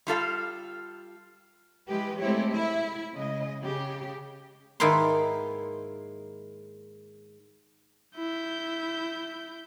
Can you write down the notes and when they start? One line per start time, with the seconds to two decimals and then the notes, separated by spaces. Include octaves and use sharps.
0.07 G3 F4 A4 F5
1.87 E3 G#3 G4 B4
2.20 G#3 A3 C4 E4 G4 C#5
2.52 E4 E5
3.14 C#3 G#3 D#5
3.62 C#3 G4
4.80 G#2 D#3 A#3 E4 B4 C6
8.16 E4 G6